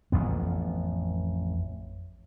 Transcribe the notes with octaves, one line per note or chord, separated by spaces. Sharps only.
A1 F2 B3